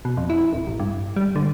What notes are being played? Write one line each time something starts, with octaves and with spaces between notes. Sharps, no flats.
B2
F2
E4
D1
A1
G2
G3
D3